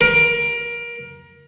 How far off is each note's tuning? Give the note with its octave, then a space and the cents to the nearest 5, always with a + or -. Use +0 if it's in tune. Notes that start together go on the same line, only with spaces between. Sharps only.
A#4 +25